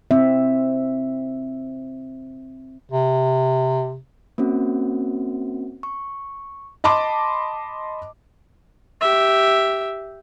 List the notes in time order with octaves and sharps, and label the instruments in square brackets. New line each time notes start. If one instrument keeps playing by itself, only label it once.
[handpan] C4 E5
[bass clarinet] C3
[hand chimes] A#3 C4 C#4 F#4
C#6
[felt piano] D#5 A5 B5 C6 D6
[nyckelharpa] G4 E5